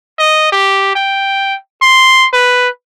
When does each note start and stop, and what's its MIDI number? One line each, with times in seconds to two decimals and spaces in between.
0.19 0.49 75
0.52 0.92 67
0.95 1.56 79
1.82 2.27 84
2.33 2.68 71